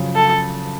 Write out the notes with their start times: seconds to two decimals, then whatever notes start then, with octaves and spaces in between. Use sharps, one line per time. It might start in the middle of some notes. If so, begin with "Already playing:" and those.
Already playing: F#2 C#3 F3
0.15 A4